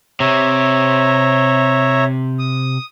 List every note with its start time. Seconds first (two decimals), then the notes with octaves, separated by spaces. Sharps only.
0.20 C3 C#5 E5 A#5
2.39 D#6